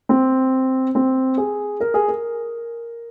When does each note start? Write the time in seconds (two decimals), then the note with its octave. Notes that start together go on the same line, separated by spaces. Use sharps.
0.09 C4
0.95 C4
1.38 G#4
1.80 A#4
1.94 G#4
2.08 A#4